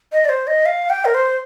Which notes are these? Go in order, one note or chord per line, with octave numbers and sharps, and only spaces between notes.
D#5
D5
C5
D#5
F5
G5
A#4
C5